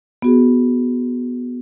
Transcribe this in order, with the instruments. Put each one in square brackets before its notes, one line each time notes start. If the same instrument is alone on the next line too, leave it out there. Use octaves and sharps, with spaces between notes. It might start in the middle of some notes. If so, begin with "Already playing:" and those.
[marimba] B3 F#4 G#4